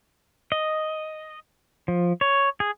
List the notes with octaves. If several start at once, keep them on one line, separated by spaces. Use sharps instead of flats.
D#5
F3
C#5
G#4